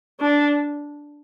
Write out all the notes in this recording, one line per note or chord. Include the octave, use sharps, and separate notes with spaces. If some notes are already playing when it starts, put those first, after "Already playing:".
D4